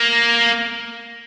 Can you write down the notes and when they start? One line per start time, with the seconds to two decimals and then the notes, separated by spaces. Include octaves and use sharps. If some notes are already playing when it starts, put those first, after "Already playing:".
Already playing: A#3